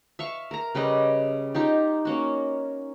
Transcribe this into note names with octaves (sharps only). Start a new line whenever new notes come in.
E5 F5 C#6
A#4 A#5
C#3 G3 B4 D#5
D#4 F4 G4
A#3 C#4 F#4